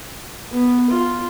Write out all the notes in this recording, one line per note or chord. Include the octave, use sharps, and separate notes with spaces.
B3
F4